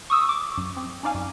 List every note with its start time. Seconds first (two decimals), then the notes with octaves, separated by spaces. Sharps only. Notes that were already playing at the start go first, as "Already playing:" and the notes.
0.10 C#6 D#6 E6
0.29 D6
0.58 F#2
0.77 C4
1.03 C#4 D#4 D5 F5 G#5
1.14 F#2